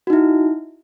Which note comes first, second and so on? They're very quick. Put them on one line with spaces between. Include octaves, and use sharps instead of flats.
F#4 D#4 E4